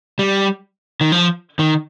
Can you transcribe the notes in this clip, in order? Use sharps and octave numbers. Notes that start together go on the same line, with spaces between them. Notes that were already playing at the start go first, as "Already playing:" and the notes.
G3
D#3
F3
D#3